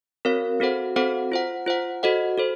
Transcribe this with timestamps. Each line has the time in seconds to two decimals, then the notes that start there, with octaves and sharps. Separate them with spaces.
0.25 C4 F#4 A#4 C#5 F5
0.60 C4 F#4 A4 C5 F#5
0.96 C4 F#4 A4 C5 F#5
1.32 F4 C5 F#5
1.66 F4 C5 F#5
2.03 F#4 A4 C5 D#5 F#5
2.38 F#4 A4 C5